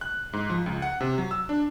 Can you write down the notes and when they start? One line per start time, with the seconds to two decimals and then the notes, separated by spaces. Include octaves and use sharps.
0.01 F#6
0.33 G#2
0.50 F3
0.66 C#2
0.82 F#5
1.01 C3
1.18 F#3
1.31 E6
1.49 D4